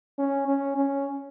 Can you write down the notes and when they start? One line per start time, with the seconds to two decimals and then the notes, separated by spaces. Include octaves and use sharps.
0.19 C#4
0.48 C#4
0.77 C#4